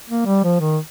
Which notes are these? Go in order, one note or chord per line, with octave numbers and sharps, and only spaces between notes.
A#3
G3
F3
D#3